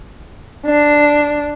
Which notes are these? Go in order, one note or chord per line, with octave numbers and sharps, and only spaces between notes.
D4